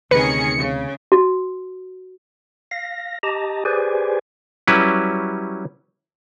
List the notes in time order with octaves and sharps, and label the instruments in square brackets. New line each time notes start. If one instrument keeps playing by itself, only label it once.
[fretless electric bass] D2 C3 [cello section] D#3 C#4 G#4 [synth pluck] B4 [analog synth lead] C#7
[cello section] C#3
[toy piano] F#4
[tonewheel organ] F5 A#6
G4 D#5 A5 A#5
G4 G#4 B4 C5 D5 G#5
[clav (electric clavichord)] F#3 G3 C#4 E4 B4